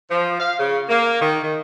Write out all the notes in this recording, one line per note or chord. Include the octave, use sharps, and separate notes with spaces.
F3
F5
C#3
A#3
D#3
D#3